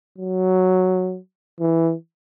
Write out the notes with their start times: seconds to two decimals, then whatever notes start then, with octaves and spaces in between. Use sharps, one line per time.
0.18 F#3
1.60 E3